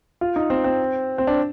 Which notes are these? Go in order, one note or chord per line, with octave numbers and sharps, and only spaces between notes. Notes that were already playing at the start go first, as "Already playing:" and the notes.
F4
D#4
C4
C4
C4
D4